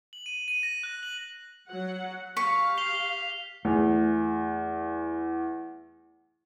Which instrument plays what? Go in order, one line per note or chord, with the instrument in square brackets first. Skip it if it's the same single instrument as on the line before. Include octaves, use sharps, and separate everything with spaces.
[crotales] F#7
D#7
D#7
A#6
F#6
F#7
[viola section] F#3 F#5
[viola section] G4 F5 [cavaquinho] C#6 [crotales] B6
[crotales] C7 F7 G7
[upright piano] E2 [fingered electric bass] A3